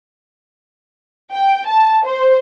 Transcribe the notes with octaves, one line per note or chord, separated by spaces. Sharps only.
G5
A5
C5